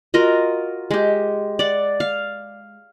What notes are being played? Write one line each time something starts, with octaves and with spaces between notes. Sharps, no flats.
F4 F#4 A#4 D#5
G#3 G4
D5 F#5
F5